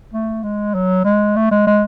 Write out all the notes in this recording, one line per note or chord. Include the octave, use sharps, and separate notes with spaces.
A3
G#3
F#3
G#3
A3
G#3
G#3